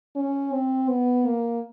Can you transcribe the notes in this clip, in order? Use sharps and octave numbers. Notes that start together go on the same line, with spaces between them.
C#4
C4
B3
A#3